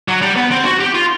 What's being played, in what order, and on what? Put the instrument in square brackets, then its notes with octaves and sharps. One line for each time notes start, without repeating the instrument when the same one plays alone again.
[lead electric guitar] F#3
G3
B3
C4
F#4
G4
F4